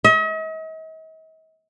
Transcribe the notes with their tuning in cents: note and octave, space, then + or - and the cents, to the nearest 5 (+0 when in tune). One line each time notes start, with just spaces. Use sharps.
D#5 +45